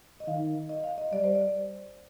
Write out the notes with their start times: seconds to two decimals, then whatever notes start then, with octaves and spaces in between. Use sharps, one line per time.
0.20 D#5
0.28 D#3 F5
0.69 D#5
0.84 F5
0.98 D#5
1.12 G3 D5
1.24 C5
1.35 D5